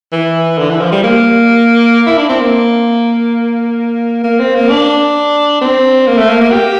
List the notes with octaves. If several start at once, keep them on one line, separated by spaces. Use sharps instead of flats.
E3
D3
E3
F3
G3
A#3
E4
D4
C4
A#3
A#3
C4
A#3
D4
C4
A#3
A3
A#3
A#3
G4